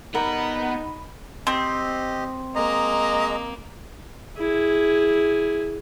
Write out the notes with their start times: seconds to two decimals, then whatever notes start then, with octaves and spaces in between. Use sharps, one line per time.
0.15 G3 B3 D#4 A#4 F#5 B5
1.47 C4 G4 D#5
2.56 G#3 A#3 D#5 A#5
4.37 E4 G#4